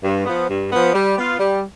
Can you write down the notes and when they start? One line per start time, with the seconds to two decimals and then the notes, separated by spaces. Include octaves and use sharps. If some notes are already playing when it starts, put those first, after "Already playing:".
0.04 G2
0.26 F3 B3
0.49 G2
0.72 F3 B3
0.94 G3
1.17 B3 F4
1.39 G3